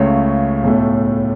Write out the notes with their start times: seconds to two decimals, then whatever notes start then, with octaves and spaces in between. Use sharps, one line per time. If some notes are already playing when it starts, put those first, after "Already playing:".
Already playing: C#2 C#3 A3 C#5
0.63 B1 A2 A3